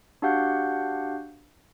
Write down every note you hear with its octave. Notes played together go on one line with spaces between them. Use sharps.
D4 F#4 G4 F5 F#5 G6